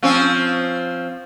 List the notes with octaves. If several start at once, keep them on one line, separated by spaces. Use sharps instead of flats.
F3 C4 C#4